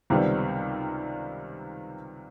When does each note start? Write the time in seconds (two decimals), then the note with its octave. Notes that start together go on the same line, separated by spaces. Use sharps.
0.10 C#2 C3 D#3 G3 B3